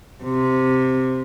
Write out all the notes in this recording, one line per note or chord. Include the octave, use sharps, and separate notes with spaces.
C3